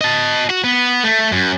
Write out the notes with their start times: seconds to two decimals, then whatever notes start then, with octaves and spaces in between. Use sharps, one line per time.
0.01 D#5 A5
0.50 F#4
0.64 B3
1.04 A3
1.32 F#2